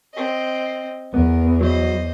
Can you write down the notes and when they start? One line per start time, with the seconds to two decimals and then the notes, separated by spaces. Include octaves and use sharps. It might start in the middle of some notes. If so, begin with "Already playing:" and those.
0.14 C4 D#5
1.14 E2 B3 A#4
1.61 F#3 C5 D#5